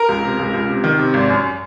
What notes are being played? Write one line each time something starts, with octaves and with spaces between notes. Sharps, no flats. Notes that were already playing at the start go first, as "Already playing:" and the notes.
Already playing: A#4 A#5
C#2
C3
C#2
C#2
C3
D#3
C3
G#1
F#2